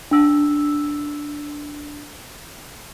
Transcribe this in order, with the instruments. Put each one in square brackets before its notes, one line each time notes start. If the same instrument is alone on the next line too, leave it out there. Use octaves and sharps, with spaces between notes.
[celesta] D4 E6